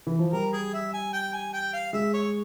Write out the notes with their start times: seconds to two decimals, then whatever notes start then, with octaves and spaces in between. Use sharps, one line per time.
0.07 E3
0.19 F3
0.33 G3 A#4
0.53 G#4
0.73 E5
0.93 G#5
1.13 G5
1.33 G#5
1.53 G5
1.73 F5
1.93 G#3 E5
2.14 C#5